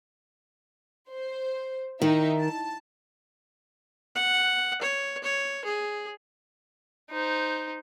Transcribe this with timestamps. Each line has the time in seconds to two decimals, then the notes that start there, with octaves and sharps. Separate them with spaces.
1.09 C5
2.02 D#3 D#4 E5
2.38 A5
4.16 F#5
4.81 C#5
5.23 C#5
5.65 G#4
7.11 D#4 C5